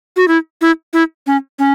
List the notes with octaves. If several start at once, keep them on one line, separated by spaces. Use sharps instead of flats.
F#4
E4
E4
E4
C#4
C#4